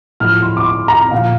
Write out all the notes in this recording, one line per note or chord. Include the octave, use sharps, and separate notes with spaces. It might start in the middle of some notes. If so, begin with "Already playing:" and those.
A2 F3 F6
C6
D6
C6
A#5
A#2 F3 F5